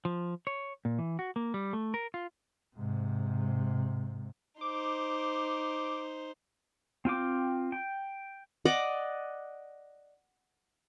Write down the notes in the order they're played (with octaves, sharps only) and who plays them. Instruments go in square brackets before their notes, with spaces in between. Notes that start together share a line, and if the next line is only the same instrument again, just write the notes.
[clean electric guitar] F3
C#5
A#2
E3
F#4
A#3
G3
A3
A#4
F4
[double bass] G#2 C3
[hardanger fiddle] D#4 C5 [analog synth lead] D6
[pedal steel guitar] C4 F4 G5 D6
G5
[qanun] D5 D#5 F#5 D6